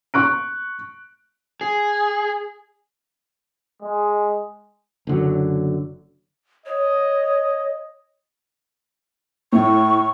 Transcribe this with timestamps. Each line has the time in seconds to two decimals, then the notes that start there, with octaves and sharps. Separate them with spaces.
0.14 C#6 F#6 D7
1.61 G#4
3.82 G#3
5.07 F#1 D3 F#3
6.66 C#5 D#5
9.53 A2 C#6